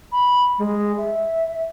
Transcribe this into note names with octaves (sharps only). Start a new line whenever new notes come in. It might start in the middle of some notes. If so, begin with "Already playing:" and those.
B5
G#3
E5